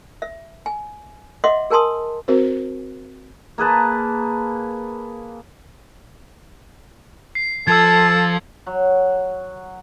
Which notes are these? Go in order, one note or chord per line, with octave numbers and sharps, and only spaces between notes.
E5
G#5
D#5 E5 F#5 C6 D6
G#4 A#4 G#5 A5 C6 D#6
C4 F#4 A#4 C5
A#3 G#4 B4 A5
C7
F3 A4 A5 E6 G#6
F#3